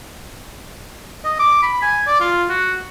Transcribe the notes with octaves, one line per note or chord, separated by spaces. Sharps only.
D#5
D6
B5
G#5
D5
F4
F#4